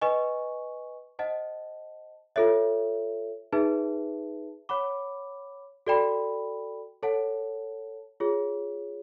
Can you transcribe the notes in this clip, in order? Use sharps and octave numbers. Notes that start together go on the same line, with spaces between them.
B4 D#5 G#5 C#6
C5 D#5 F#5 A5
F4 A4 C#5 E5
D#4 G#4 B4 E5 A5
C#5 F#5 B5 D6
F#4 A4 D5 G5 B5
A4 C#5 F#5 A5
F4 G#4 C#5